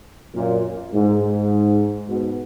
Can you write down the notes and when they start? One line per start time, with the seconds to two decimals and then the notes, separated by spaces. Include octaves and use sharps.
0.35 F#2 A#2
0.92 G#2
1.21 G#2
2.08 G#2 B2